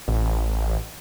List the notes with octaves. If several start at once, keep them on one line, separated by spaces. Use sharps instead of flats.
A1